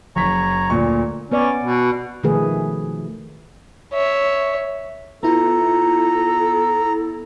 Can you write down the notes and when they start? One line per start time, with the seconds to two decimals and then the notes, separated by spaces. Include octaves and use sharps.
0.16 F#1 C#5 A#5 C#6 B6
0.70 D2 A#2 C#6
1.32 B3 C#4 B4 D5
1.60 B2
2.23 B2 D#3 F3 A3 G#4 B4
3.93 C#5 E5
5.23 B3 E4 F4 A4 A#5